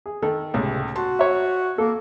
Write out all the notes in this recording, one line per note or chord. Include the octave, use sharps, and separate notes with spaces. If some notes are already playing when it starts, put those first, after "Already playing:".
G#4
D#3 A4
C#2 A2 C3
F#4 A5 C6
C#5 E5
A#3 A4